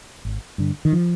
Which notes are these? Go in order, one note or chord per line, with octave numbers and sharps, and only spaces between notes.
G#1
G2 D3
D#3
F3